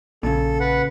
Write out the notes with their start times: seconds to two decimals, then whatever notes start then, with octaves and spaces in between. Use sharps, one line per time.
0.23 A#1 A#2 C#3 A4
0.60 B4 F#5